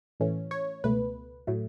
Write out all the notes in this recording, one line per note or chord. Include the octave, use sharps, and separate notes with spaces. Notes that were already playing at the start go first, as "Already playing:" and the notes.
A2 E3 A3 C#4
C#5
C#2 B2 A3 B4
A2 F#3 A3